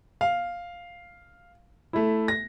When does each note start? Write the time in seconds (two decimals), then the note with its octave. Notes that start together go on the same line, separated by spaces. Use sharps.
0.21 F5
1.93 A3 E4
2.28 A#6